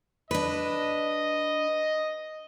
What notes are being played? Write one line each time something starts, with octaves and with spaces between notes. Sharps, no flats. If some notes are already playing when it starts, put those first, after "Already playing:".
D4 B4 D#5